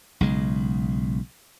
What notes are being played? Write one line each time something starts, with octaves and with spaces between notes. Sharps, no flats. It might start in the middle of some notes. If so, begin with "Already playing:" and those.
B1 C#3 G#3